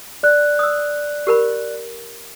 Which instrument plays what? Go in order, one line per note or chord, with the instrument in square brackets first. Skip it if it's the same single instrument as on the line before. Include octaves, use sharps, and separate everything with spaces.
[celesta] D5 F#6
[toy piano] D#6 E6
G4 A#4 B5